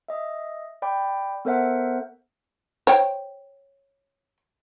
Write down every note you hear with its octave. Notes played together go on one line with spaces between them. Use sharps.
D#5 E5
D5 G5 B5
B3 A4 A#4 C5 E5 F#5
C5 C#5 G5